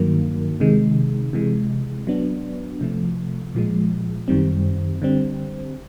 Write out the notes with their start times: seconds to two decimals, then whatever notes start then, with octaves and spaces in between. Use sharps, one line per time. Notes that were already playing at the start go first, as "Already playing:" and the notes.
Already playing: G2 D#3 F#3 A#3
0.60 C3 D#3 G#3
1.33 C3 E3 G#3
2.07 F#3 B3 D4
2.81 C3 F3 A3
3.55 A#2 F3 G#3
4.28 F#2 D#3 G3 C4
5.02 D3 G3 C4